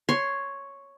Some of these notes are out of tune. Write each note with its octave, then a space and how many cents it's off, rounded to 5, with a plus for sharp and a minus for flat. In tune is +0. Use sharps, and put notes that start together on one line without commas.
C#5 +0 C6 +0